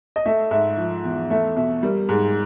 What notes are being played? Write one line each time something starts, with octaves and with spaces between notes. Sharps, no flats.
D#5
A3 E5
G#2 E5
F3
E2
A3 E5
B2 E5
G3 A#4
G#2 G#4